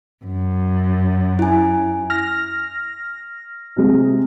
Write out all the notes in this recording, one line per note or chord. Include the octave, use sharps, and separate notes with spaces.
F#2
E4 G#5
F6 A#6
C3 G#3